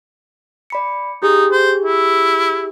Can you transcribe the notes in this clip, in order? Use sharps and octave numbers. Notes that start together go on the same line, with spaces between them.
D5 B5 C#7
D#4 G4 G#4
C5
E4